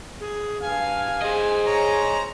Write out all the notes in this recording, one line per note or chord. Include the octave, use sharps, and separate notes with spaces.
G#4
G2 F5 G#5
G#4 C5 D#5
G#2 C#5 G#5 A#5